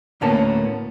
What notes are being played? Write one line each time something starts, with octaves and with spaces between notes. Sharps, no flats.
D2 A2 A#3 B3 C#4 A5